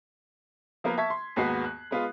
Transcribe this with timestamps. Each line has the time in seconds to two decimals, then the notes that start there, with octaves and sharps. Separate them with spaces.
0.84 F3 A#3 B3 A#4
0.98 E5 A5 C#6 G#6 B6
1.10 C6
1.36 D#2 G#2 B3 F#4 F#6 C7
1.64 F#6
1.91 G#3 B3 F4